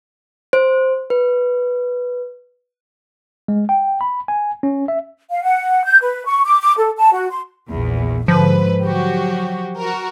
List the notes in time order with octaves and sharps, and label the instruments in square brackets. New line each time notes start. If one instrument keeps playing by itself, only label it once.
[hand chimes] C5
B4
[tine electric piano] G#3
G5
B5
G#5
C#4
E5
[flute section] F5
F#5
G6
B4
C#6
D6
D6
A4
A5
F#4
C6
[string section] A#1 E2
[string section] G#2 D3 B4 [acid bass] F3
[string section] F#3 F#4 G4
F#4 A#4